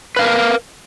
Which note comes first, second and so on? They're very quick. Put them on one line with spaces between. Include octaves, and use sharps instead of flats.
B4 F5 A#4